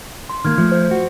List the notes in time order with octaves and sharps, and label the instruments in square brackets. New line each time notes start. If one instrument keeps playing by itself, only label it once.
[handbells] C6
[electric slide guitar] D#3 A#3 [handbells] F6 G#6
[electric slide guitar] F3 [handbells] A3
[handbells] C5
[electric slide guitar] F#4